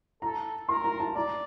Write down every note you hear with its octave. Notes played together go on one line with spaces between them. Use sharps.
A4 A#5
A#4 C6
A#5
A5
D5 A#5